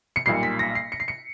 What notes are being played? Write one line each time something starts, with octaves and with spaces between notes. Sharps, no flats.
C#7
B1 A#2 G3 C7
B6
A#6
C7
C#7
C7
C#7